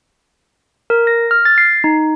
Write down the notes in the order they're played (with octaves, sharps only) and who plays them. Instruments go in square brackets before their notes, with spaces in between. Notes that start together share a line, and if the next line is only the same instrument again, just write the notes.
[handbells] A#4
A#6
F6
A6
C7
D#4